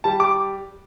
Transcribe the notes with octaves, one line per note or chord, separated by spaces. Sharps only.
G3 A5
D6